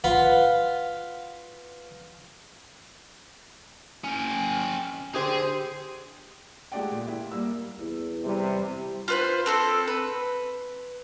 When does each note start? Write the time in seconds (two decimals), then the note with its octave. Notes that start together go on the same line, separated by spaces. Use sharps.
0.04 F4 B4 F5 F#5
4.04 C#4 G5
5.15 D3 G4 G#4 C5
6.72 G#3 A3 G4 D5 F#5 G5
6.91 A#2
7.07 E4
7.31 G3 A#3 E6
7.79 E2
8.24 C3 G3
9.08 F4 B4 C5
9.46 C4 A4 C6
9.88 B4